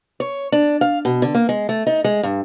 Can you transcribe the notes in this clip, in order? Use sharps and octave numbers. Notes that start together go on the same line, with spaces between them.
C#5
D4
F5
B2
D3
A#3
G#3
A3
D#4
G#3
G2